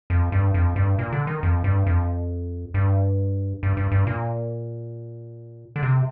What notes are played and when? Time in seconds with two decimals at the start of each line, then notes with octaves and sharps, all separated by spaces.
0.10 F2
0.32 G2
0.54 F2
0.76 G2
0.99 A#2
1.12 D3
1.27 D#3
1.43 F2
1.64 G2
1.86 F2
2.74 G2
3.63 G2
3.77 G2
3.92 G2
4.07 A#2
5.76 D3
5.83 C3